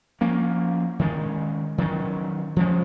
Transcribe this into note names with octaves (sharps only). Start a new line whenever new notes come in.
F3 A#3 C#4
D#3 G#3 C#4
D#3 F#3 C#4
F3 G#3 C#4